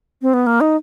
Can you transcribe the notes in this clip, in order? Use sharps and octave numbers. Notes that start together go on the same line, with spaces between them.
C4
B3
A#3
D#4